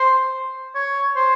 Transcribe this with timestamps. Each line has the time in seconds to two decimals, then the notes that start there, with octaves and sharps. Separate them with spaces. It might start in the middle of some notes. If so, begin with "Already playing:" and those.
Already playing: C5
0.75 C#5
1.16 C5